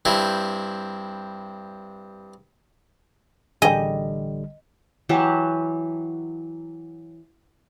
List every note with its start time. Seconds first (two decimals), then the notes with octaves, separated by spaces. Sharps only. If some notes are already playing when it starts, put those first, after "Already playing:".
0.05 G2 C4 E4
3.62 A1 D3 G3 G#4 D#5 G5
5.09 E3 F#3 G4 A5